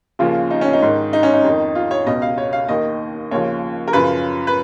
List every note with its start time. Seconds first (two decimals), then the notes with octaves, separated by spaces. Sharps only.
0.19 D#2 C#3 F3 F4
0.50 D#4
0.61 C#4
0.73 D#4
0.82 G#2 D#3
1.13 D#4
1.23 C#4
1.34 D#4
1.44 F2 D#3
1.75 F4
1.91 C#5
2.06 C#2 B2 D#5
2.22 F5
2.38 C#5
2.53 F5
2.68 D#2 D#3 D#5
3.31 D#2 C#3 F3 C#5
3.88 A#4
3.93 F#2 C#3 F3 B4
4.47 B4